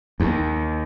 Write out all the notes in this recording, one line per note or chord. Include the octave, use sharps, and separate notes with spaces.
D#2